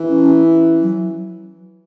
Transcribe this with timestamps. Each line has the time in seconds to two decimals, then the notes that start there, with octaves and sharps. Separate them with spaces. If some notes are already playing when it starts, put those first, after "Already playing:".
Already playing: E3
0.09 C#4
0.82 F#3